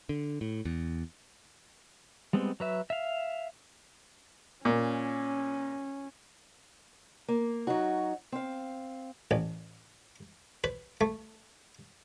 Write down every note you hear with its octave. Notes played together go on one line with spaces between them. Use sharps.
D3
A2
E2
G3 G#3 B3 C4
F#3 B4 E5
E5 F5
A#2 C#4
A#3
F#3 D#4 F#4
C4 F5
A1
B4
A3